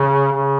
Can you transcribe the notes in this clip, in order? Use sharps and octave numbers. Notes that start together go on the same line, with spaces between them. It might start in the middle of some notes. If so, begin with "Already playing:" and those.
Already playing: C#3
C#3